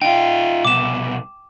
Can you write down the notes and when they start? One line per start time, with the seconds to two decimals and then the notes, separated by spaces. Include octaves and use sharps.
0.02 D#4 F4 G5
0.65 C2 B2 D6 E7